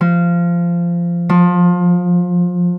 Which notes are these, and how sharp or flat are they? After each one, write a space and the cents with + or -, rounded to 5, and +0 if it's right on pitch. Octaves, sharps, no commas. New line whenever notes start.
F3 -15
F3 +25